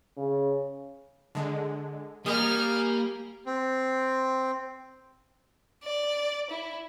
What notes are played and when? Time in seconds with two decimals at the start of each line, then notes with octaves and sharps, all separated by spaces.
0.17 C#3
1.35 D3 G#3
2.26 G3 A#3 G#5 D#6 F6
3.46 C4
5.84 D5
6.50 E4